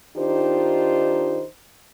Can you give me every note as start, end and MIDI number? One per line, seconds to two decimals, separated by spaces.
0.17 1.44 51
0.17 1.44 62
0.17 1.44 63
0.17 1.44 65
0.17 1.44 67
0.17 1.44 72